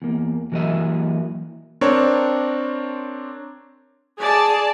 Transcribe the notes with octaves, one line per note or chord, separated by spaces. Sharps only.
E2 A#3
E3 F#3 A#3 E4 D#5 E5
C4 D4 A#4 C#5
G#4 D5 A5